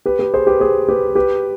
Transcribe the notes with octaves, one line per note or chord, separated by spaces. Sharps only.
G4 B4
G4 B4
G#4 C5
G4 B4
G#4 C5
G4 B4
G4 B4